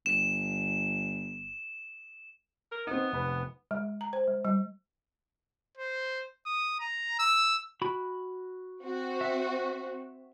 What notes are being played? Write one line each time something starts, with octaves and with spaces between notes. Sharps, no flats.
G1 E7
A#4
B3 C4 D#4
F1 B4
G#3
A#5
C5
G#3
G3
C5
D#6
A#5
E6
F#4 B5
C4 F#4
E5